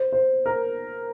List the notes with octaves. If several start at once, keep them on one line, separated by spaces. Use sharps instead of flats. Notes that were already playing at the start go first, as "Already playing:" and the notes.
Already playing: C5
C5
A#4